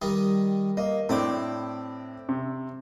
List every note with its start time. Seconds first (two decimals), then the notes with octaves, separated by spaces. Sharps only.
0.02 D#3 G3 D#4
0.77 A#3 D#5
1.09 A2 C4 D4 E4 G5 D6
2.29 C3